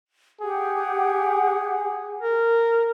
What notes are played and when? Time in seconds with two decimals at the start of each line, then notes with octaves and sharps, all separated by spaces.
0.41 G4 G#4 F#5
2.21 A#4